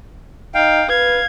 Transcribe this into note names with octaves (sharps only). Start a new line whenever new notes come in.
D#4 F5 G5
B4 F5 G#6